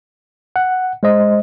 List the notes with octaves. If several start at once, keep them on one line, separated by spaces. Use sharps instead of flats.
F#5
G#3 C5 D#5